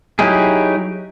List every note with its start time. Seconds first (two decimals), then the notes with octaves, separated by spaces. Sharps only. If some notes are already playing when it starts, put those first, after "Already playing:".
0.19 F#3 D#4 E4 G4 G#4